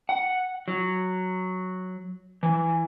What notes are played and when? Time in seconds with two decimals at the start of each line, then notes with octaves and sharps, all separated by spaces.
0.09 F#5
0.68 F#3
2.43 E3